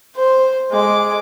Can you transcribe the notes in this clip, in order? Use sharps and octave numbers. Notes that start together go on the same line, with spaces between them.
C5
G#3 D6